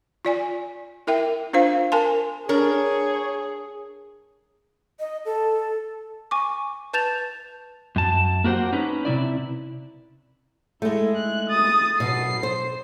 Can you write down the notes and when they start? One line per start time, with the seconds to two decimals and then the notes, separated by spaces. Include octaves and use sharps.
0.25 F4 D5 G#5
1.07 E4 A#4 E5 G5
1.53 D4 F4 C5 F5
1.92 A#4 G#5 A5 C6
2.49 D4 G#4 A#4 C#5
5.00 D#5
5.25 A4
6.31 G#5 C#6 D6
6.93 B4 A5 G6 A6 E7 F7
7.96 F#2 A5
8.44 A#3 F#4 G4 C5 F#5
8.73 C#4 D#4 B4
9.05 C3 F3 E4 D5
10.82 G#3 A3 E4
11.16 F#6
11.49 D#6 A6
12.00 B2 F#3 C7
12.43 C5